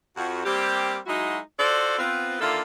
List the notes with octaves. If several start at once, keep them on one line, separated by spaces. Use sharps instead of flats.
F2 F#4
G3 A#3 C4 G4
F#3 G#3 D#4 E4 F#4
F4 F#4 A4 C5 D5
B3 C4 F4
D3 D#3 A#3 F4 A4 E5